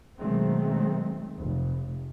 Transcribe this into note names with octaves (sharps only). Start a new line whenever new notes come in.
B2 D#3 F#3 G#3 A3 C4
F1